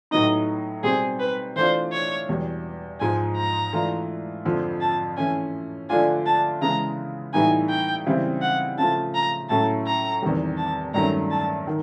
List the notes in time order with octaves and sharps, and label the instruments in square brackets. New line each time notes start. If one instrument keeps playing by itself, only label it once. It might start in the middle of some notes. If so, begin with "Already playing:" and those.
[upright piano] A2 F#3 B3 D#4 [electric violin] D#5
[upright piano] B2 G3 C4 [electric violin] G#4
[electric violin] B4
[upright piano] E3 A3 D4 F4 [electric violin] C5
[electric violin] C#5
[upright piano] E2 B2 G3
[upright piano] G#2 F3 G#3 [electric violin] G#5
[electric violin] A#5
[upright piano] E3 A3 D4 F4
F2 D3 F3
[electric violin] A5
[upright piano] E3 A3 C#4 [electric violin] G#5
[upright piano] D3 F3 A3 D4 F4 [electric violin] G#5
[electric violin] A5
[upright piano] C#3 E3 G#3 B3 [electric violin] A#5
[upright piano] A2 E3 G3 B3 D#4 [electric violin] G#5
[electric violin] G5
[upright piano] C#3 E3 G3 C4 E4
[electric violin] F#5
[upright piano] C#3 F3 A3 [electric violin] A5
[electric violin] A#5
[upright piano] A2 F#3 A3 C#4 E4 [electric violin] A5
[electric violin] A#5
[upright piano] E2 C3 D#3 G3
[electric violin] A5
[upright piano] G2 D#3 F#3 A3 C#4 [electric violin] A#5
[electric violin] A5
[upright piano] D#3